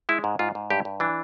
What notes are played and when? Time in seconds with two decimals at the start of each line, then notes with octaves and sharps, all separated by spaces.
0.09 G#3 E4
0.24 G#2
0.39 G#2 F4
0.55 G#2
0.70 G2 G4
0.85 G2
1.00 E3 D4